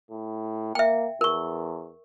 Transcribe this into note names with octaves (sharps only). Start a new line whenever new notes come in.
A2
A#3 E5 G5
E2 A#4 C#6